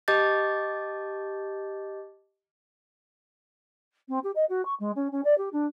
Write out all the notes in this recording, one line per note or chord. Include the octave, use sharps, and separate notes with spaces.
G4 D#5 A5 D6 G6 A6
C4
G4
D#5
F#4
C#6
G#3
C#4
C#4
D5
G4
D4